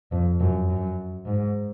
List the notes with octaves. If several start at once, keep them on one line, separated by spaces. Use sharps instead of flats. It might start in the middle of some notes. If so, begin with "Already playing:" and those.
F2
F#2
F#2
G#2